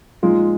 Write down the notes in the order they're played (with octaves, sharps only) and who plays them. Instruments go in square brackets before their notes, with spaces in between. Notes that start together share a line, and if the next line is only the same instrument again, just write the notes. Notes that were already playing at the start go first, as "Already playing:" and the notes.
[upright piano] A#2 F3 G#3 D#4 [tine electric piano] F4